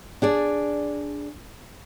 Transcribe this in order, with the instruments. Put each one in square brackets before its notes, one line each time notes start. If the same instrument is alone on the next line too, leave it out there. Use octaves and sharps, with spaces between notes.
[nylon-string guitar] D4 G#4 D5